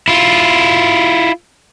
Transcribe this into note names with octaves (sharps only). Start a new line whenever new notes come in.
E4 F4